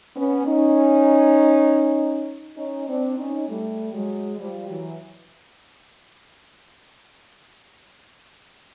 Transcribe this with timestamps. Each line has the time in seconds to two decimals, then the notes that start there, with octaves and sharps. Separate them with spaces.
0.16 B3 C#4
0.46 C#4 D#4
2.57 C#4 D#4
2.88 C4 D4
3.18 C#4 D#4
3.49 G3 A3
3.93 F#3 G#3
4.39 F3 G3
4.69 E3 F#3